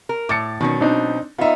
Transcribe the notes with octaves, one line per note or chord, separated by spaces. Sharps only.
A#4
A2 D6 A6 C#7
B2 D#3 F#3 C#4
C4 D4 D#4
B3 D#4 F4 E5